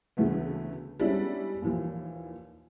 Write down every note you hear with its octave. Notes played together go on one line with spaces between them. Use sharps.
D2 C#3 E3 A3 B3
G3 G#3 B3 C#4 D4 E4
D#2 A#2 E3 F3